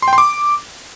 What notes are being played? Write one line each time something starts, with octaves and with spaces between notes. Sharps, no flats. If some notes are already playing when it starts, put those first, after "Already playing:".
C6
G5
C6
D6